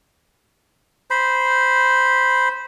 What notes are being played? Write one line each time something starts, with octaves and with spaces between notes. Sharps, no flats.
C5 B5